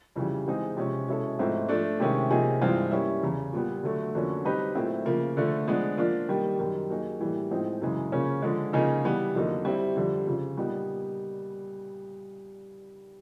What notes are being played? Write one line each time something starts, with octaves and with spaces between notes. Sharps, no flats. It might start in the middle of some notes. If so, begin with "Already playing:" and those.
F2 C#3 E3 G3
E3 G#3 C4 D#4 G#4
C3 F3 G#3 C#4
B2 G#3 C#4 E4 A4
G#2 F3 A3 C4 E4
F3 A3 D4
C3 D#3 G#3 C#4 E4
C3 F3 A#3 D#4 G#4
G2 E3 G#3 C4 F4
G3 A#3 C#4 E4
E2 C#3 E3
A#2 G3 B3
D3 F#3 A3
F2 D3 F#3 A#3 C#4
G3 C4 D#4 G4 B4
A#2 F#3 A3 C4 E4
C#3 F3 A#3
D3 F3 A3
F3 G#3 B3 D4
F3 A#3 D4 F4
D#3 G3 A#3
F#2 D#3 G3
F#3 A#3 D#4 G#4
A2 E3 G3 A#3
A2 F3 G#3 C4 D#4
F#2 C#3 E3 G#3
C#3 F3 A#3 C#4
D3 F3 G#3
C#3 F3 A#3 D#4 G#4
E3 G3 B3
F2 D3 F#3 A#3 D#4
G3 C4 E4
F2 D3 G3
F2 C#3 F3
A#2 G3 B3 D#4